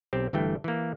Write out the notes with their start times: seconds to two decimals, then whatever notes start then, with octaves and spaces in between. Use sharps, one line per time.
0.13 B1 C4 G4
0.33 G1 G2 E3 A3 G5
0.64 E3 A#3